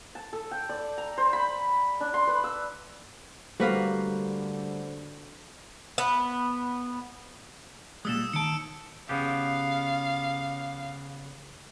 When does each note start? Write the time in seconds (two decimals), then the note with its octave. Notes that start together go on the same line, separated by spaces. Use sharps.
0.15 A5
0.33 A4
0.51 G5
0.69 D5
0.98 A#5
1.18 C5
1.33 B5
2.01 D4
2.14 C6
2.27 B4
2.44 E6
3.60 D3 G3 A3 A#3 F#4 B4 C5 F5
5.98 B3
8.05 A#2 G3 G#3 D#6 E6 E7
8.33 D#3 A5 C#7 D7
9.09 C#3 B3 G4 F5